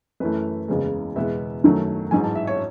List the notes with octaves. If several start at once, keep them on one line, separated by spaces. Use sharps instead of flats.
F#2 E3 A3 B4
F#1 E2 C#3 E3 G#3
E2 B2 G#3 B3 E5
F#2 D#3 F#3 A3
A1 G#2 F#3 G#5
A5
E5
C#5